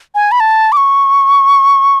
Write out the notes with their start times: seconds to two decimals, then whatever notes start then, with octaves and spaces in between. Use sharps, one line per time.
0.15 G#5
0.32 B5
0.40 A5
0.72 D6
0.77 C#6